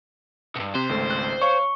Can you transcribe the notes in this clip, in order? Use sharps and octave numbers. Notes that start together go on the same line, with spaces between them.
B1 G2
C3 C5
G#1 C#2 A3
F#6
C#5 F5 C#6